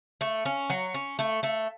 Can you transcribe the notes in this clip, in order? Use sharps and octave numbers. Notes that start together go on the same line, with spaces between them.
A3
C#4
F#3
C#4
A3
A3